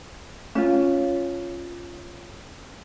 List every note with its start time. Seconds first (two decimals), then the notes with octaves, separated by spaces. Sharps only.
0.55 C#4 F4